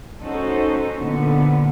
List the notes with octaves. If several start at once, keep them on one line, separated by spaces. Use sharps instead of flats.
C#4 D#4 F#4 A4 C5
A#2 D3 B3